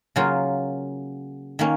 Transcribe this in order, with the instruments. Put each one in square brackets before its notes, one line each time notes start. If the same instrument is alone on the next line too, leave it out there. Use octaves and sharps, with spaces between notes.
[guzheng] C#3 F#3 A#3 F4
D#3 A#3 C#4